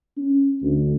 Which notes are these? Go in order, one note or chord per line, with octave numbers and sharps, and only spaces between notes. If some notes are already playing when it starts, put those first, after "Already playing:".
C#4
D2